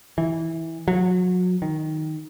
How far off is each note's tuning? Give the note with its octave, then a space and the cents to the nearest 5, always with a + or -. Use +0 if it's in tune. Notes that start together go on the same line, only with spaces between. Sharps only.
E3 -15
F#3 -30
D#3 +5